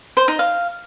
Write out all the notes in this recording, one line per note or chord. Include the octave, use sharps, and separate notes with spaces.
C5
D#4
F5